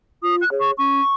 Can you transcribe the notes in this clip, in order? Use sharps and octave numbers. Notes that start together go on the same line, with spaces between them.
F4 D#6
F#6
G#4 C#5
C#6
C#4 C#6